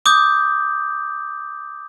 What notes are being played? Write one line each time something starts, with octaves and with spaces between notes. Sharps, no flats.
D6 D#6 G6